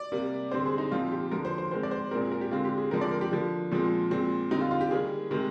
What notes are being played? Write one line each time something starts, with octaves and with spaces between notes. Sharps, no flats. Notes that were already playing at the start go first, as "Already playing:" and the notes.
Already playing: D5
C3 G3 A#3
D3 G3 C4 C5
G#4
D#4
A#2 F3 C4 F4
G4
D3 F3 A#3 A#4
C5
C5
D#3 G#3 C4 C5
D5
C5
A#2 G#3 C4 A#4
G#4
A#4
G4
D3 G#3 C4 F4
G4
G#4
D3 F3 G#3 C4 A#4
D5
A#4
G4
D3 F3 A#3
A#2 F3 G#3 C4
A#2 G#3 C4
D3 G3 C4 D#4
F4
F4
G4
D#3 G3 A#3 G#4
C3 D#3 G#3 C4